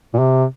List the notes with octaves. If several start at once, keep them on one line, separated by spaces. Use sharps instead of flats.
A#2
C3